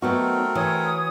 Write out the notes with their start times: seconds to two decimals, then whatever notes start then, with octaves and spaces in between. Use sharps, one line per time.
0.02 F#3 A3 B3 C4 D#4 F#4 A#4
0.55 E3 C#5 D#6